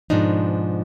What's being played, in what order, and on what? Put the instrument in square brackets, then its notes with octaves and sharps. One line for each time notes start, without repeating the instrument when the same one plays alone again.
[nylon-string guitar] G#2 B2 F3 D4 D#4